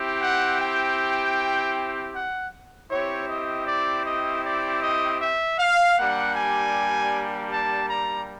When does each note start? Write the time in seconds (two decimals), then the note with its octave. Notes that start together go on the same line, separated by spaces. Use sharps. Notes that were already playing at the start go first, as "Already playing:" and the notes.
Already playing: C4 E4 G4
0.22 F#5
0.61 G5
2.14 F#5
2.91 C4 E4 G4 C#5
3.29 D#5
3.67 D5
4.06 D#5
4.45 D5
4.83 D#5
5.21 E5
5.59 F5
5.98 G3 A#3 D4 G4 F#5
6.35 G#5
7.51 A5
7.89 A#5